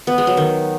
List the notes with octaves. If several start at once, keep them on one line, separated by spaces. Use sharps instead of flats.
B3
G#3
F#3
D#3